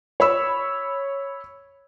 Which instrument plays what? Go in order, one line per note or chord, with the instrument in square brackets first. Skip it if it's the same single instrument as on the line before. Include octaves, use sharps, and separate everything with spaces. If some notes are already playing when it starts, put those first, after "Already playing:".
[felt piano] C#5 B5 E6